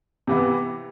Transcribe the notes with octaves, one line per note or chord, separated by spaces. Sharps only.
C3 E3 B3 E4